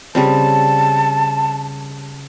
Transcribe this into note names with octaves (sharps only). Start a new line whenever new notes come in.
C#3 G3 C4 A5